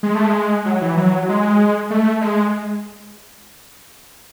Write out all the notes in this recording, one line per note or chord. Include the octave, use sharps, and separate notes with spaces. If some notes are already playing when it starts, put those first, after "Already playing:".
G#3
A3
G#3
F#3
E3
F#3
G#3
A3
G#3